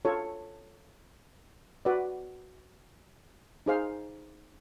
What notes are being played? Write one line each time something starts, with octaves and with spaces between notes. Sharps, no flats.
F4 A4 C#5
F#4 B4 D5
D#4 G#4 C5 F5